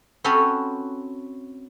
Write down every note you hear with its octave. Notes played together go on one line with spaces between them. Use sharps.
C4 C#4 F#4 A4 B4 C#5